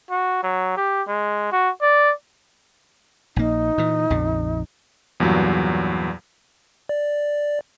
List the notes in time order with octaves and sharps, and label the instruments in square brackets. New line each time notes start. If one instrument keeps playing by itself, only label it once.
[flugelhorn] F#4
F#3
G4
G#3
F#4
D5
[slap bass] A#1 A#3 [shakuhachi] D#4
[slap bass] A#2 E3
A#1 F2 C#3
[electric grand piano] E2 G2 A#2 F#3
[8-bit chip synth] D5